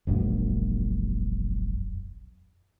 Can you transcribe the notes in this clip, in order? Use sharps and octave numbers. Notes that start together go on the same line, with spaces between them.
E1 A#1 F#2